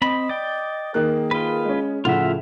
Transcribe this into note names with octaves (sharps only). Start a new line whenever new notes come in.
C4 D#5 B5
D5 G5
D#3 A#3 G#4 F#6
F4 B4
G#3 C#4
A2 C#3 F3 F4 E5 F#5